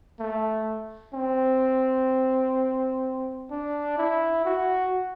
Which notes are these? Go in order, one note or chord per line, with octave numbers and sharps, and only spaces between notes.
A3
C4
D4
E4
F#4